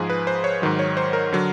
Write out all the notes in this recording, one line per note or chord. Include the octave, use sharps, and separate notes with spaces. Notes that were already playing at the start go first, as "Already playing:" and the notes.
Already playing: G#2 F3 G#4
B4
C5
C#5
G#2 D#3 F#3
C#5
C5
A#4
D3 F#3